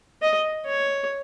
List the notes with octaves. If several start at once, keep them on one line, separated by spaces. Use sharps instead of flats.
D#5
C#5